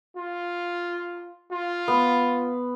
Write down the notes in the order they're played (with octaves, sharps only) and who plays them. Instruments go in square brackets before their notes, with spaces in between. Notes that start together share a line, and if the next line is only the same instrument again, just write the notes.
[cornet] F4
F4
[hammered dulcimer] B3